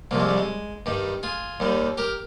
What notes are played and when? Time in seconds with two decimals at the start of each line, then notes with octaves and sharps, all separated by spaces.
0.11 C2 C3 F3 A#3
0.20 G#3
0.29 G3
0.38 G#3
0.86 G2 D#3 G3
1.23 F4 G#4
1.60 D#2 D#3 G3
1.98 G4 A#4